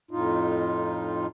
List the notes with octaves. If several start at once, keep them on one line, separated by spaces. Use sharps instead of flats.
F2 A2 D#4 F4